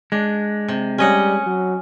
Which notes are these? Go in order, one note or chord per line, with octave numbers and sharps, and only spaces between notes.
G#3 D4
C3
G3 C#4 D#5 F#5
F#3